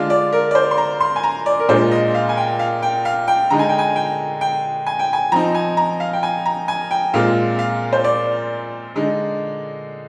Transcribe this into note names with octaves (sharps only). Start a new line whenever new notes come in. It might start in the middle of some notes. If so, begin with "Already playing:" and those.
Already playing: D3 G#3 D4 F4 F5
D5
A#4
D5
C5
C6
A#5
C6
G#5
A#5
D5
A#4
A#2 G#3 D4 F4 C5
D#5
F5
G#5
G5
F5
G5
F5
G5
D3 G#3 D#4 A#5
G#5
G5
G#5
G5
G5
G#5
G5
G#5
F3 C4 D#4 A#5
G#5
A#5
F5
G5
G#5
A#5
G#5
G5
A#2 G#3 C4 F4 F5
F5
C5
D5
D3 G#3 D#4